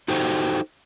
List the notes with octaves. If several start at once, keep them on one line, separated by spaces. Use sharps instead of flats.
D#4 F#4 G4 A4 C5